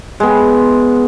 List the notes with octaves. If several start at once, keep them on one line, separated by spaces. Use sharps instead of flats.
G#3 B3